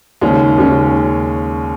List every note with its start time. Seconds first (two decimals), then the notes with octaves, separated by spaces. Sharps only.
0.21 D#2 C#3 G#3 C#4
0.58 D#2 C#3 G#3 C#4